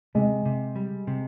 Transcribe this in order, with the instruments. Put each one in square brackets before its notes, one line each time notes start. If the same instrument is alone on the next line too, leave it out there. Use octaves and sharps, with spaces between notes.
[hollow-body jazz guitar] C3 [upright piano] G#3
[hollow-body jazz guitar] C3
G3
C3